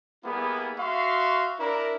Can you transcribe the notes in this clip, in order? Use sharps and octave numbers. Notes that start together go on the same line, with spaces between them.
G3 A#3 B3 E4 G#4
F#4 E5 F5 C6 C#6
D4 E4 A#4